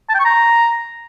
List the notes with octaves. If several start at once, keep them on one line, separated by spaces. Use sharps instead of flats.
A5
G5
C#6
A#5